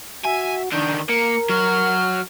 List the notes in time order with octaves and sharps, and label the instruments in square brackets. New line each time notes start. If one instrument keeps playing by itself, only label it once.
[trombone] F#4 [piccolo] E5 [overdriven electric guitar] G#5
[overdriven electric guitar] D3 D#3 [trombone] D4 [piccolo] G6
[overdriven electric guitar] A#3 [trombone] A#4 [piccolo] C#7
[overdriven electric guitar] F#3 F#4 [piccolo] F6